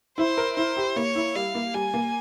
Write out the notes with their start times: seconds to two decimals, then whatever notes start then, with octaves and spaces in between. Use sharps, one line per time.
0.18 E4 C5
0.37 A#4
0.57 E4 C5
0.77 G4
0.96 A#3 C#5
1.16 E4
1.35 G3 F5
1.55 A#3
1.74 G3 G#5
1.94 A#3